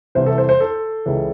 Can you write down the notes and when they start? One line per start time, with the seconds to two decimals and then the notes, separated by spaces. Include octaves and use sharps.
0.15 C2 C3 E3 C5
0.26 A4
0.38 C5
0.49 C5
0.60 A4
1.06 C#2 C#3 E3